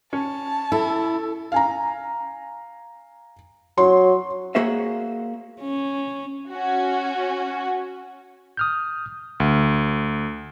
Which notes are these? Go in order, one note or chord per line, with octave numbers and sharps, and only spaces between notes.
C#4 A5
E4 A4
F5 G#5 A#5
F#3 C6
A#3 F#4 G#4 C5 E5
C#4
C#4 F#4
D#6 F6 G6
D2